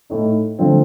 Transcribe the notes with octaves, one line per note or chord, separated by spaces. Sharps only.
A2 A3 D#4
D3 F3 A3 C4 F4